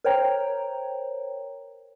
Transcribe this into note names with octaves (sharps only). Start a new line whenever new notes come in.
A#4 C5 C#5 G5 A#5